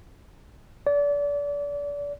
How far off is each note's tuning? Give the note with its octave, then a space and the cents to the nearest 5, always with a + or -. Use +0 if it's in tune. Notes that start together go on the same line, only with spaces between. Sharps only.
D5 -30